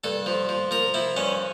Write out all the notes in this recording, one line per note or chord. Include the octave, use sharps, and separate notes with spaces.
G2 A4
F3
F3
F3 A#4
F3 E4
G2 C#4